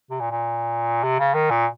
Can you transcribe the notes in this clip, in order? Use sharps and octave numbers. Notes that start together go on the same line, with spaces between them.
C3
A#2
A#2
C3
C#3
D#3
A#2